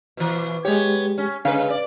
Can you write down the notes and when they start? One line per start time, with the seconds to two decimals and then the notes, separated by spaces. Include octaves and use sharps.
0.17 B2 E3
0.65 G#3 B3 G4 C#5
1.18 C#4
1.45 C#3 G#3 C#4 B4 F5
1.70 D5